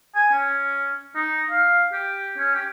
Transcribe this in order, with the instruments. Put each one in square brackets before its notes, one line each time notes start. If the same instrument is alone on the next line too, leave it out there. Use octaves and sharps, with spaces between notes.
[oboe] G#5
C#4
D#4
F5
G4
C#4
G4